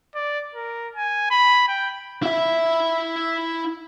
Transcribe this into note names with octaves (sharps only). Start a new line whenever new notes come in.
D5
A#4
G#5
B5
G5
E4 E5